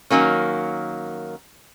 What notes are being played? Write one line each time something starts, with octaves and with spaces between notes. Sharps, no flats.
D#3 F#3 A#3 C#4